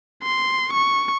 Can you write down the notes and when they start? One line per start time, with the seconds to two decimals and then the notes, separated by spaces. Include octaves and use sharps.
0.23 C6
0.73 C#6